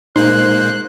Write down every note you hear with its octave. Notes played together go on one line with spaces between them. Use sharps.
A#2 G#3 A#3 D#4 C5 F#6